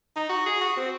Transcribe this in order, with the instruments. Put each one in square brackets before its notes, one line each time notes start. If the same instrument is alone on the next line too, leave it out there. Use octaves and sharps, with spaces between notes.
[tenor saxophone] D#4
F#4
G#4
F#4
C4